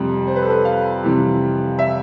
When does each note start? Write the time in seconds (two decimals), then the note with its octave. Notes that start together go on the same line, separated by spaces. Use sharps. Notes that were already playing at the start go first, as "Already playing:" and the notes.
Already playing: F2 C3 G3
0.27 C5
0.36 B4
0.43 A4
0.50 B4
0.65 F5
1.03 F2 C3 E3 G3
1.79 E5